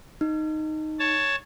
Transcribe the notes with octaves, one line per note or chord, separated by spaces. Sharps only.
D#4
C#5 A5